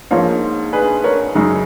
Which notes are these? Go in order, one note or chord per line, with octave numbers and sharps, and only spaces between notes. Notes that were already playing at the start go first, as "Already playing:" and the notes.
G#2 F3 A#3 C#5 F5
G#4 B4
A#4 C#5
F#2 C#3 G#3 D#4